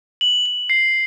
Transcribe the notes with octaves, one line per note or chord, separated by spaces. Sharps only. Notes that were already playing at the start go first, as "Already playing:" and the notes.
F#7
F#7
C7